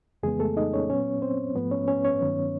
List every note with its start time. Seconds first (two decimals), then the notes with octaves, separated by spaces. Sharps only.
0.23 F2 C#3 E3 G#3 B3 G#4
0.39 A3 A4
0.57 D#4 D#5
0.74 C#4 C#5
0.90 A#2 F#3 B3 C#4 C#5
1.22 C4 C5
1.55 G#2 F3 A3 B3 B4
1.71 C#4 C#5
1.88 C#4 C#5
2.04 C#4 C#5
2.22 G2 D#3 F#3 B3